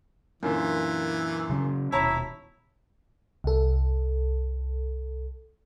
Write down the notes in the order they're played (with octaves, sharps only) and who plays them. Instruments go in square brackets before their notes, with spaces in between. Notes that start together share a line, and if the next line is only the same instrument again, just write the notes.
[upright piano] F#2 A#2 D3 [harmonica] E3
[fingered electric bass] C#3 F#3 C#4
[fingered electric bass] D#1 B2 [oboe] E4 [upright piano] C#5 A5 A#5
[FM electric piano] C2 A4